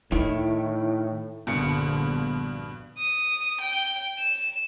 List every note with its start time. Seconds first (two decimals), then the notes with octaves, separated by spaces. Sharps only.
0.12 A2 D#3 D#4 E4
1.47 A#1 G2 B2 D3 C#7
2.98 D#6
3.61 G5
4.19 E7